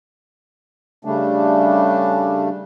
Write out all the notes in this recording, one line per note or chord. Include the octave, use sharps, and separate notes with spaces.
C#3 G3 A3 D4